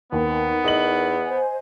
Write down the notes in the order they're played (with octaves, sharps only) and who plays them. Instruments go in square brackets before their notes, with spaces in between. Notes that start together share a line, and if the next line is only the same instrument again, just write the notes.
[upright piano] D#2 [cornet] B3 [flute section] D#4 A#4
[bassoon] E2 [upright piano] D#5 F#7
[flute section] C5 G#5